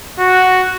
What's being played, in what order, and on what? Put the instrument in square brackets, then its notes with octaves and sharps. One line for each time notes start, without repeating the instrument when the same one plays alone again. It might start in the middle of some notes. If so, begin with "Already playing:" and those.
[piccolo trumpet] F#4